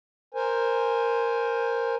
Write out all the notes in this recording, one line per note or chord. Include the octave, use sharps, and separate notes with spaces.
A#4 C5 G#5